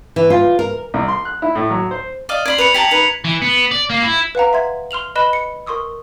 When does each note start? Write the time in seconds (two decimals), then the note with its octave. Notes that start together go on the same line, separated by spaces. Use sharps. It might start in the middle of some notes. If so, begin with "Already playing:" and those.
0.16 E3
0.30 F4
0.59 A#4
0.94 C2
1.08 C6
1.25 F#6
1.42 E4
1.55 A2
1.70 F#3
1.91 C5
2.29 D5 D#5 F5
2.46 D5 B5 C6 G#6 F#7
2.58 B4 D5 C#7 F7
2.74 G4 A5 A#5 B6
2.91 D#4 B4
3.25 E3
3.42 B3
3.71 D5
3.90 A#3
4.03 E4
4.35 B4 F5 F#5 A#5
4.53 E5 C6 G#6
4.91 C6 F6 F7 F#7
5.15 B4 D#5 B5 F#6 E7 G7
5.33 C#7
5.67 A#4 C6 C#6 D#6 E6